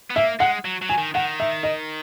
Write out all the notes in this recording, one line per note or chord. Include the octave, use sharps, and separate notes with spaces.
B3
A#3 E5
G#3 F#5
F#3
F#3
G#5
D#3
D#3 F#5
E5
D#5